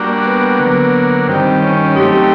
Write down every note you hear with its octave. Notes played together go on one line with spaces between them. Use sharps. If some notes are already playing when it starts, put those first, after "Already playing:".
Already playing: G3 A#3 D4 F#4
B3
D3 F#3 A#3
G2 D#3 G3 C4
C#4
F#3 A3 C4 D#4 G4